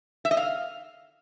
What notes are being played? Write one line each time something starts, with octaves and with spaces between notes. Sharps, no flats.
E5
D#5
F5